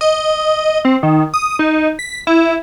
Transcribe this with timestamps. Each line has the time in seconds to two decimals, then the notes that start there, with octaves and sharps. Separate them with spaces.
0.01 D#5
0.85 C4
1.03 D#3
1.34 D#6
1.59 D#4
1.99 B6
2.27 E4